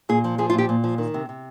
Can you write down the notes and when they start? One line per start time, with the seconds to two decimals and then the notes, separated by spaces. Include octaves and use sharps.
0.09 A#2 G#4
0.24 F3
0.38 F3 G#4
0.50 F4
0.53 A#2
0.58 G4
0.69 A#2
0.84 F3
0.98 D#3
1.14 C3
1.29 C3